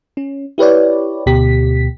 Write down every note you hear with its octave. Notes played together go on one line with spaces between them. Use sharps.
C#4
E4 G4 B4 C#5 D5
D2 B2 G4 B6